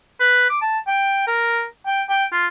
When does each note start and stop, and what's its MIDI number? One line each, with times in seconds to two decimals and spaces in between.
0.20 0.48 71
0.50 0.57 86
0.62 0.79 81
0.87 1.24 79
1.27 1.65 70
1.86 2.03 79
2.09 2.25 79
2.32 2.47 65